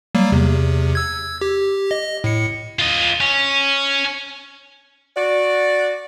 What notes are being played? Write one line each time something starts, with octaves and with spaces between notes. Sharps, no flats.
F#3 G3 A#3
E2 C3
E6 G#6
G4
D#5
A2 C#7
F4 D#5
C#4
F#4 D5